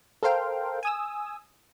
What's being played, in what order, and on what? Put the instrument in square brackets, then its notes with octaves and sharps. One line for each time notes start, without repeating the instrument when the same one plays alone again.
[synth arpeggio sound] A4 A#4 C5 F5 G5
G#5 D#6 E6